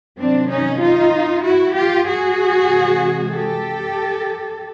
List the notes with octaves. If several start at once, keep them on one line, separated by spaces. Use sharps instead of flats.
C3 D#3 F#3 C4 D4
C#4 D#4
D#4 F4
E4 F#4
F4 G4
F#4 G#4
C3 E3 G#3
G4 A4